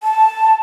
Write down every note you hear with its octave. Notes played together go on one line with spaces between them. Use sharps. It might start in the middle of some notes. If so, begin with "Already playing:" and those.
A5